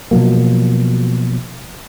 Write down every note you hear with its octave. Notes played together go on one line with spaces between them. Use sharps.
B2 F3 F#3 A#3